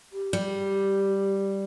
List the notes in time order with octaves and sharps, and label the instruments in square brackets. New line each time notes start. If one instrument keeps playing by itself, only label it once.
[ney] G4
[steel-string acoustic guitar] G3